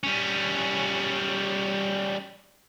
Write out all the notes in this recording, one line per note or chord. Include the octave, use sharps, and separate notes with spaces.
G3 C#4